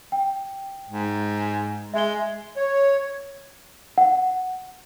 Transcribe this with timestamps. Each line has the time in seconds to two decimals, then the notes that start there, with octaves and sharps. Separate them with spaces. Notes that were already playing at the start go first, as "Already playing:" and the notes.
0.12 G5
0.88 G#2
1.94 G#3 E5 G7
2.56 C#5
3.98 F#5